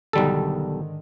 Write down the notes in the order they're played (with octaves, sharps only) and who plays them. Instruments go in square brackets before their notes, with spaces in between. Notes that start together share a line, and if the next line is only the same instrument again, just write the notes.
[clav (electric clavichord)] B1 G3 A4 [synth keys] G#2 D3 D#3